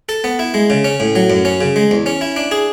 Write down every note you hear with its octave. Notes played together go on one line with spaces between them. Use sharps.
A4
B3
E4
G#3
C#3
C#4
A2
F#3
F#2
C#4
C#3
G#3
E2
C#4
E4
D4
G#4